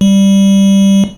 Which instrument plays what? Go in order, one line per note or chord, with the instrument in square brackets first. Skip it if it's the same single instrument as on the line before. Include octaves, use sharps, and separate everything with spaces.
[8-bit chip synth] G3